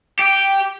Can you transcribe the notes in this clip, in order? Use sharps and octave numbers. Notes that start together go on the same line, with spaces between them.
G4